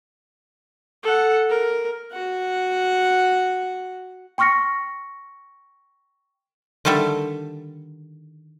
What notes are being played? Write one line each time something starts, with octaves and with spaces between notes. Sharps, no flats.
A4 F#5
A#4
F#4 F#5
G5 C6 C#6 F6 A#6 C#7
D3 D#3 G3 A4 E5